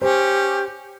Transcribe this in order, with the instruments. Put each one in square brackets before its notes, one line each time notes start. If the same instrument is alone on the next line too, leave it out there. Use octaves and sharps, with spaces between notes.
[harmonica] C#4 [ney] G4 [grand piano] C5